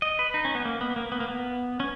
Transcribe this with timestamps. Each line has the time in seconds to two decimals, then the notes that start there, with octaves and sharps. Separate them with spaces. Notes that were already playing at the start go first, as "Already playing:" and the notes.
0.02 D#5
0.19 B4
0.34 D#4
0.45 C#4
0.55 B3
0.65 A#3
0.81 B3
0.96 A#3
1.12 B3
1.20 A#3
1.28 B3
1.80 C#4